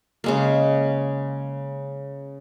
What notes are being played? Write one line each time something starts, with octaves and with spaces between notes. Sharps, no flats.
C#3 G#3 A#3